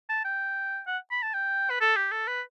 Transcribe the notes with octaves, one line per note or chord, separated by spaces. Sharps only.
A5
G5
F#5
B5
A5
G5
B4
A4
G4
A4
B4